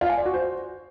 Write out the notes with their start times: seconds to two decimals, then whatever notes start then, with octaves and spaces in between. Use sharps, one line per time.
0.01 F4
0.09 G#5
0.17 D5
0.26 F#4
0.34 C5